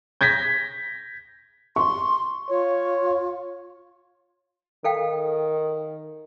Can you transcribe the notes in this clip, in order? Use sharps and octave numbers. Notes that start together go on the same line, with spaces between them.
G6 G#6 A#6 B6
C6 C#6
F4 C#5
D#3 A4 F5 G5